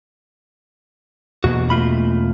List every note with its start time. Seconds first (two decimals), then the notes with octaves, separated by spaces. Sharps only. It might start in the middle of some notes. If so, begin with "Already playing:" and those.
1.44 E2 B2 A#3 F#4
1.70 A3 F4 B5